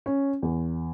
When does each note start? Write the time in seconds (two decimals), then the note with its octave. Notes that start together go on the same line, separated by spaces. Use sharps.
0.06 C#4
0.43 E2